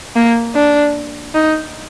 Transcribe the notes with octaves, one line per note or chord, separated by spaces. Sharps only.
A#3
D4
D#4